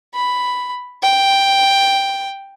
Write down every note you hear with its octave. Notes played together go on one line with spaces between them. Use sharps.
B5
G5